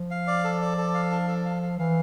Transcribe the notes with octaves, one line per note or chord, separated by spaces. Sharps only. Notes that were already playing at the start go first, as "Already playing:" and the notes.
Already playing: F3
F5
D5
A4
D5
A4
F5
D4
A4
F5
F5
E3 F5